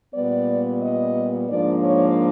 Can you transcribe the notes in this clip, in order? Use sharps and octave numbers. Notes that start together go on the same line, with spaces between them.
A#2 G3 B3 D5
D#5
G#2 F3 A#3 D4 D5
C#5